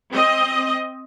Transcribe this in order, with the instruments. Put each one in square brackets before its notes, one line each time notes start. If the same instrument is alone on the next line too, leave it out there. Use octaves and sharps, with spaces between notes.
[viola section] C4 D#5